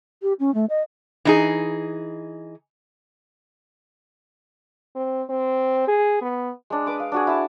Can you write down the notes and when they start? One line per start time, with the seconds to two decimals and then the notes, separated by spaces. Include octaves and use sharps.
0.22 G4
0.40 C#4
0.54 A3
0.70 D#5
1.25 E3 D#4 G#4
4.95 C4
5.30 C4
5.88 G#4
6.22 B3
6.70 G#3 D4
6.86 B4 D6 D#6
7.00 F5
7.12 D4 F#4 G#4
7.27 E4 A5